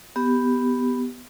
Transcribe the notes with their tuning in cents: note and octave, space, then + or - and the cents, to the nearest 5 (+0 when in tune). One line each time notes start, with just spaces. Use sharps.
B3 +5 G4 +0